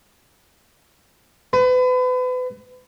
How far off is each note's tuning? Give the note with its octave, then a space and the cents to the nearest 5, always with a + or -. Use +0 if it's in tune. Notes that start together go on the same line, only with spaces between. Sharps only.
B4 +35